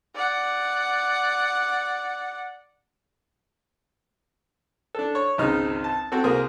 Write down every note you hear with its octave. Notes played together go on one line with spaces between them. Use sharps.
D5 F#5
D4 A4
C#5
G#1 C#2 C#3 D#4 F6
A5
C4 F#4 A4
C2 A#3 G#4 C5 A#5 D#6